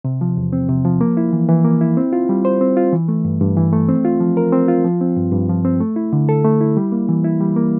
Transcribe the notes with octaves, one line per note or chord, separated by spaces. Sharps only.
C3
F3
E2
C4
C3
F3
A#3
E4
E3
E3
A#3
E4
C4
F4
G3
C5
C4
F4
E3
A3
G2
G2
E3
A3
C4
F4
F3
A#4
C4
F4
F3
C4
G2
G2
F3
C4
A3
E4
D3
A4
A3
E4
G3
A#3
E3
E4
G3
A#3